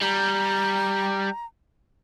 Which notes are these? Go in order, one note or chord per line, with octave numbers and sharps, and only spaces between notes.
G3 A#5